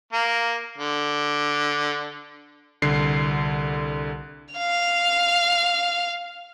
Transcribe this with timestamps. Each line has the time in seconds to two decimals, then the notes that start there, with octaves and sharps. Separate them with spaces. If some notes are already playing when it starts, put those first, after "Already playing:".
0.13 A#3
0.78 D3
2.82 C2 D3 C7
4.54 F5 F7